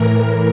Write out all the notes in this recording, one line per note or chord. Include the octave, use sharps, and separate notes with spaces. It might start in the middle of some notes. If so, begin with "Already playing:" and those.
Already playing: A2 E3 A#4